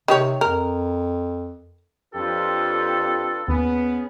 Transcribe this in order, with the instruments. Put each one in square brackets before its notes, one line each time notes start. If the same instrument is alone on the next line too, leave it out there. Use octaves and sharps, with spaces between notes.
[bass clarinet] C3 [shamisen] D#3 G4 C#5
[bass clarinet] F2 [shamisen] A#4
[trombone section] F2 G4 [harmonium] D4 F4 B4 [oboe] A4
[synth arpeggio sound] D#2 [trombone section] B3 [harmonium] C#4 G#4